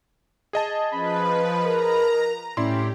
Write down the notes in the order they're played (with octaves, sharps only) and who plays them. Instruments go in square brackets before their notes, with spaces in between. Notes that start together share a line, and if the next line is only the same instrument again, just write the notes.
[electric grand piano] G#4 D#5 A5
[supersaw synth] F3 B4 [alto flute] C#4 [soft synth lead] B5
[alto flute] A#4 [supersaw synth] A#5
[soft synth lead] A2 [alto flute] C#4 [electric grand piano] E4 D5 C6 [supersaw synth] G4